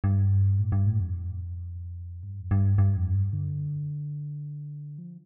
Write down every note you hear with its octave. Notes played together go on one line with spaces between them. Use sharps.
G2
A2
G2
A2
F2
G2
F2
G2
G2
F2
G2
D3
F3